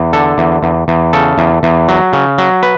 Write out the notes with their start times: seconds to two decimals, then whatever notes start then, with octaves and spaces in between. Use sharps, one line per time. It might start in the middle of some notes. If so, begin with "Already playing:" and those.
Already playing: E2
0.13 D3 A4
0.38 E2
0.63 E2
0.88 E2
1.13 C#3 A4
1.38 E2
1.63 E2
1.88 F#3
2.13 C#3
2.38 F#3
2.63 B4